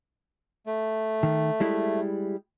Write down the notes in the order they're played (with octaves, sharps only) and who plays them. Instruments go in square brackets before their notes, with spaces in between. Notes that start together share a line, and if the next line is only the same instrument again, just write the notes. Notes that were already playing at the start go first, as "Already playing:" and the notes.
[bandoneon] A3
[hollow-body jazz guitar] D#3
G3 G#3 E4